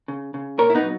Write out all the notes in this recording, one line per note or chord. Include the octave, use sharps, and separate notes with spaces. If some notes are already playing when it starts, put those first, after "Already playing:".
C#3
C#3
A#2 A#4 C#5
E4
B3 D#4
F#3